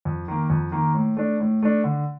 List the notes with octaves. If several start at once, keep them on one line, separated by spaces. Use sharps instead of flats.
F2
D#3 A#3
F2
D#3 A#3
A2
A3 D4
A2
A3 D4
D3